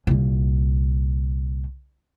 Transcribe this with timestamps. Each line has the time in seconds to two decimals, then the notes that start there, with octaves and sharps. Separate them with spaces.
0.07 C2 A#2